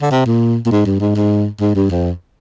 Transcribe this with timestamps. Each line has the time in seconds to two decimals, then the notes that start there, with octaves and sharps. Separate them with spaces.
0.02 D3
0.11 C3
0.26 A#2
0.66 A#2
0.71 G#2
0.86 G2
1.01 G#2
1.16 G#2
1.61 G#2
1.75 G2
1.90 F2